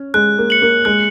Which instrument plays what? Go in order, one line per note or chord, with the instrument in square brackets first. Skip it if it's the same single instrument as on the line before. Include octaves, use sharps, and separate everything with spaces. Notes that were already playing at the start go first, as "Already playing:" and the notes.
Already playing: [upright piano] C#4
[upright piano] G#3 [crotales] F#6
[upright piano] A#3
[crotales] C#7 F#7
[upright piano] A#3
[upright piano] G#3 [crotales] F#6